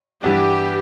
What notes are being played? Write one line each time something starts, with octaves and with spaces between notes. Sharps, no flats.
G2 E3 G3 B3 D4 G4